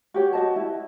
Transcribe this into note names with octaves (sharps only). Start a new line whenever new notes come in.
F#4 G4 C#5
F#4 D#5 A5
E4